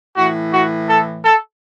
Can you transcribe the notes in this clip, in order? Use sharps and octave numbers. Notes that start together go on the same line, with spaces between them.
A2 E3 F#4
F#4
A4
A4